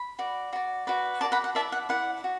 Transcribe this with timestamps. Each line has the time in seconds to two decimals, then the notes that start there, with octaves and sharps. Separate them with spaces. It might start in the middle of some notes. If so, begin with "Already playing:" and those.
Already playing: B5
0.19 F#4 D5
0.53 F#4 D5
0.87 F#4 B4 D5
1.21 F#4 B4 D5 A5 D6
1.32 F#5 B5
1.44 F#5
1.55 E4 D5 E5 A5
1.72 F#5
1.89 E4 D5 F#5
2.24 F#4